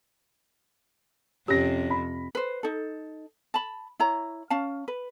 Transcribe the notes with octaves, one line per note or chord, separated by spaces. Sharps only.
F2 C3 C#4 G4 A#6
B5
B4 C5
D#4 A4
A5 B5
E4 C#5 A#5
C#4 F5 A5
B4